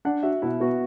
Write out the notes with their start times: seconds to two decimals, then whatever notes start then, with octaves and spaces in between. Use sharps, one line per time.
0.05 D4 F#5
0.23 F#4 E5
0.42 B2 E4
0.60 B3 F#4